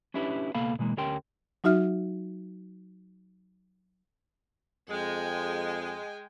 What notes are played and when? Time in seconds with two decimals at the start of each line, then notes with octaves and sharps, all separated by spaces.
0.14 C#4 D4 E4 G4 B4 C#5
0.55 C#2 B2 A#3 A4 F5 B5
0.79 B2 E3 G#3 A#3
0.97 D2 C#4 G4 A#4 G5 C6
1.64 F#3 D#4 F#4 E5 F6
4.90 F2 G#3 G5 G#5